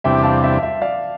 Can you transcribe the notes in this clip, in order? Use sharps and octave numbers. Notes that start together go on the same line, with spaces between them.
E2 C3 G3 D4 E5 G5
F5 A5
E5
E5
D5 F5